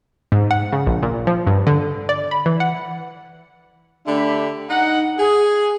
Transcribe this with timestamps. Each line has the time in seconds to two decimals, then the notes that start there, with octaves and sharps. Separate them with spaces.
0.32 G#2
0.51 F#5
0.72 C#3
0.87 A#1
1.02 A#2
1.27 F3
1.47 G2
1.67 D3
2.09 D5
2.31 B5
2.46 E3
2.60 F#5
4.07 D3 A3 D4 G4 E5 B5
4.70 D#4 F#5
5.18 G#4